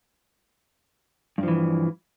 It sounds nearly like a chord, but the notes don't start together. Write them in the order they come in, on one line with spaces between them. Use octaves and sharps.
G2 F3 E3